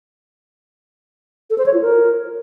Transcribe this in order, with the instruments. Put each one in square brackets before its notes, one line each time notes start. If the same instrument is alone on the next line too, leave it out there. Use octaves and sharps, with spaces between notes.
[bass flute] A4
C5
C#5
F4
A#4